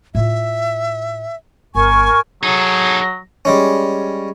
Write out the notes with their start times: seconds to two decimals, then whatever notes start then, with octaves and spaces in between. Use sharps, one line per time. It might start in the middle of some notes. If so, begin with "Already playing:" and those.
0.15 A2 F4 E5
1.75 G1 A#4 G#5 C#6
2.43 F#3 D#4 G#4 A4
3.45 G3 G#3 C#4